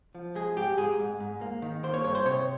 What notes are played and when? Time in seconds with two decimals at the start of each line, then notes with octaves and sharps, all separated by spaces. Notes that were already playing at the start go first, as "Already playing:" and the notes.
0.15 F3
0.35 G#3 G#4
0.56 G#2 G4
0.78 G#2 G#4
0.99 G#2
1.20 G#2
1.41 A#3
1.62 D#3
1.83 A#3 C5
1.94 C#5
2.04 G2 C#5
2.15 C5
2.25 C3 C#5